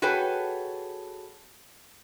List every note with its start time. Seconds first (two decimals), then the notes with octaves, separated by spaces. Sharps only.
0.02 F#4 G#4 A4 B4 C#5 G5